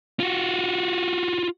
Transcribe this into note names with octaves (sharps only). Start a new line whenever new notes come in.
F4 F#4